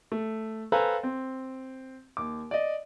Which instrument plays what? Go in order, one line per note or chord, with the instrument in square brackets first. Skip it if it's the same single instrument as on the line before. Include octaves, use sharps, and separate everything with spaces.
[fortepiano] A3
A4 B4 C5 F5 G#5 A#5
C4
D#2 D6
D5 D#5